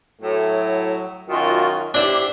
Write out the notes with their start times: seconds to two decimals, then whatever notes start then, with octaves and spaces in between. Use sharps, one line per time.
0.21 A2 F#3
1.30 F#2 D#3 F4 F#4
1.94 B3 D4 E4 G4 C5 D5